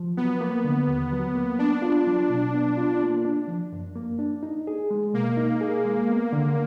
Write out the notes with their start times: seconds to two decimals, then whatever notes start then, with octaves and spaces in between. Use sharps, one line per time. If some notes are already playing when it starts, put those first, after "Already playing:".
Already playing: F3
0.17 F#3 B3
0.41 A#3
0.64 D3
0.88 D#2
1.12 F#3
1.35 A#3
1.59 B3 D4
1.82 F4
2.07 F#3
2.30 B2
2.54 B3
2.78 F4
3.01 A#3
3.25 D4
3.48 F3
3.73 F#2
3.95 A#3
4.19 D4
4.43 D#4
4.67 G#4
4.91 G#3
5.14 B2 A#3
5.37 D#4
5.61 G#4
5.85 G#3
6.09 B3
6.33 D3